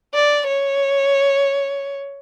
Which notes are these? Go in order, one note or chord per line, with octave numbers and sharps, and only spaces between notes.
D5
C#5